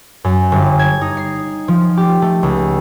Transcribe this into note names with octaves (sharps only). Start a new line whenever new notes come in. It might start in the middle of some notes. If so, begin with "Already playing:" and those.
F#2
G1
G#6
D#4
C7
F3
G4
A3
C#2